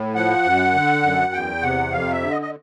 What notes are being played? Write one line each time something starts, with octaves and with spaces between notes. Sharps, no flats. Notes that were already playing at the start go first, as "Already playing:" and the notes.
Already playing: A2
F3 F#5
F#2
D3
F#2
E2 G5
C3 F#5
F2 F5
E5
D3
D#5
D#5